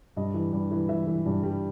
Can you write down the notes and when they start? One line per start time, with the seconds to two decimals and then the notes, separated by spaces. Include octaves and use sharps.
0.17 G2 D#5
0.34 E3
0.53 G2
0.71 E3
0.89 E3 E5
1.07 E3
1.26 G2
1.43 G3